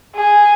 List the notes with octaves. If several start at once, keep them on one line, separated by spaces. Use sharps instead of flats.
G#4